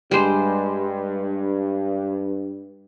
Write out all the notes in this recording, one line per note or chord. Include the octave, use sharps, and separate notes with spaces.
G2 G3 G#3 C5